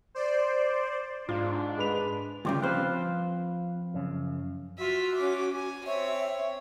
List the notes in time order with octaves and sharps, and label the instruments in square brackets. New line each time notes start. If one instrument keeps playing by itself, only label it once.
[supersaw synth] C5 D5
[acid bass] G#2 [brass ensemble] D4 [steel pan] F4
[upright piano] G#3 B4 F7
[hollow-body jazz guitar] D2 G2 C#3 [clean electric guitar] F4 G4 G5
[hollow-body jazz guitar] F3 C5 [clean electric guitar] C4 F4 B4
[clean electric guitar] F#2 C#3
[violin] F4 E5 [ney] F#4
[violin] C#4 D6
G#5
[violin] C4 C#5 [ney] E5